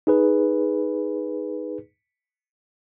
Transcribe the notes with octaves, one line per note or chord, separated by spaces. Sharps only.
D#4 G#4 B4